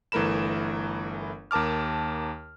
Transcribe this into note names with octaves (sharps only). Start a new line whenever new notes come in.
G1 E3 A3 A#4 B5 E7
D#2 A#4 A5 D6 F6